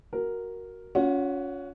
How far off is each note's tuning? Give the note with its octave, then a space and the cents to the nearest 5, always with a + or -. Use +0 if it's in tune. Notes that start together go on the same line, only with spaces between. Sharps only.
F#4 +0 A#4 +0
C#4 +15 F4 +40 F#5 +0